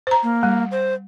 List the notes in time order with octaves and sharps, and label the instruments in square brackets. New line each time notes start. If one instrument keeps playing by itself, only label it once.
[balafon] C5 A#5
[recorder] A#3
[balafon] G3
[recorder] C5